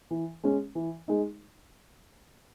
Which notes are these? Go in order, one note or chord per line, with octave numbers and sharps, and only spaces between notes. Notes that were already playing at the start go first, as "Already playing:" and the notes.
E3
G#3 C#4
E3
G#3 D#4